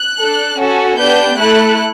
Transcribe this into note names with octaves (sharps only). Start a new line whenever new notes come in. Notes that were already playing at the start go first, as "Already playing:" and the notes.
Already playing: F#6
D4 A4
C#4 F#4 A4
B3 D4 G4 G6
A3 E4 A4 F#6